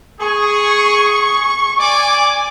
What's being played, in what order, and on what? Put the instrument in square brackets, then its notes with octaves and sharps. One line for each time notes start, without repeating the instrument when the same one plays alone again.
[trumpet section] G#4 [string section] C#6
[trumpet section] D5 D6 [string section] G#5